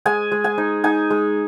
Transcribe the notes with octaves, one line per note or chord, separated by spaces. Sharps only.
G#3 G#5
G#3
G#5
D#4
D#4 G#5
G#3